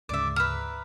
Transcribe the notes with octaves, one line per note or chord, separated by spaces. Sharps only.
D2 G#2 C#3 D5 E5
B4 E5 A#5 F6